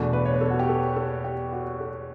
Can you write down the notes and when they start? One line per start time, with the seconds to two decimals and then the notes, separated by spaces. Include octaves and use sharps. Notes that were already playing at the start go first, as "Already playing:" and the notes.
Already playing: E2 B2 A3 D4
0.13 B4
0.25 C#5
0.34 B4
0.41 A4
0.50 F#4
0.59 G4
0.69 A4
0.96 A4
1.24 G4
1.52 F#4
1.80 A4